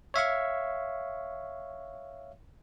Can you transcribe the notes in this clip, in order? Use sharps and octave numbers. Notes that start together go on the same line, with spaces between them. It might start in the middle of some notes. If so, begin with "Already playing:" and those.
C#5 E5 F5 C#6